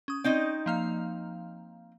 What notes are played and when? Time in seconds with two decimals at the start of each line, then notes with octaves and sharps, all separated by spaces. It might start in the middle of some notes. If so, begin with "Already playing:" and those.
0.08 C#4 D#6
0.24 C4 C#4 D#4 D5 D#5
0.66 F3 A#3 F5